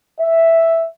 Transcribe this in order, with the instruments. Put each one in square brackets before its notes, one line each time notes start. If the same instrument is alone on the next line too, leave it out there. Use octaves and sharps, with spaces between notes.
[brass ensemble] E5